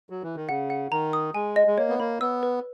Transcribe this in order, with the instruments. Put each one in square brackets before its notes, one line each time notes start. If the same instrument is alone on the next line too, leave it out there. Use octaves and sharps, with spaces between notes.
[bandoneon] F#3
E3
D#3
[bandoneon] C#3 [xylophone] F#5
[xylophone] F#5
[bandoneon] D#3 [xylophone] A#5
[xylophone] D#6
[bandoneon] G#3 [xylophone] G#5
[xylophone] D#5
[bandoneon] G#3
[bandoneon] A#3 [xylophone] C#5
[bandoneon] B3
[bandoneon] A#3 [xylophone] B5
[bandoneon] B3 [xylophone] E6
[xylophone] B4